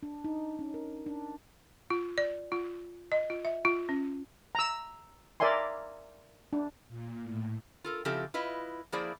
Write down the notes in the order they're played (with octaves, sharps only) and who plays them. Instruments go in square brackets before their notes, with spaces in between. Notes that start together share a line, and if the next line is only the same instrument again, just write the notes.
[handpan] D4
D#4
C#4
A#4
D4
[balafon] F4
D5
F4
D#5
F4
E5
F4
C#4
[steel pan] A#5 E6
A#4 D5 E5 G#5 C6
D4
[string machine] A#2
A2
[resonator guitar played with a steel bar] F4 A4 A#4
C#3 F3 C4 E4 G4 A4
E4 F4 B4 D#5
F3 A#3 E4 G#4 C5 D5